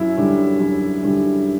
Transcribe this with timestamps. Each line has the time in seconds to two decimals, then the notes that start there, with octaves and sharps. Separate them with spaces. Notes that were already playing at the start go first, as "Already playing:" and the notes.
Already playing: F#2 E4
0.17 D3 G3
0.60 F#2
1.03 D3 G3